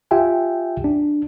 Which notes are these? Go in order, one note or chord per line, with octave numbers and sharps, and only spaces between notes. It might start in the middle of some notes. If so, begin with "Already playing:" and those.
F4 G4 E5 G5 G#5
D4